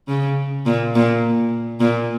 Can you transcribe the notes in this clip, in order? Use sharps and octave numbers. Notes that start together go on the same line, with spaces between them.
C#3
A#2
A#2
A#2